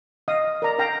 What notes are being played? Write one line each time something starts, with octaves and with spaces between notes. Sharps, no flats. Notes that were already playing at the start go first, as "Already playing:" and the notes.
D#5 F5 D#6
A#4 D5 A#5
A#4 F5 G5 A#5